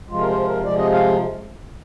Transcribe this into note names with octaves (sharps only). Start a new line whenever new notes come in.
C3 F3 G#3 F4
A#4
C5
C5
A#4
C3 F3 G#3 D5
D#5
F5